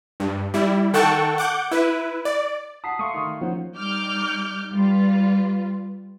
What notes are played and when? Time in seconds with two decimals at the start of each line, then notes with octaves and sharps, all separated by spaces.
0.20 G2
0.54 G3 E4
0.93 D#3 A4 F#5 G5 A5 C#6
1.38 F#5 D6 G6
1.71 E4 B4
2.25 D5
2.84 F#5 A5 D#6 B6 C7
2.99 A3 F5 C6 C#6 D#6 C7
3.14 D#3
3.41 F3 A#3 C#4 D#4 C5 F#5
3.76 G3 D#4 D6 F6 G6
4.73 G3 F4 B4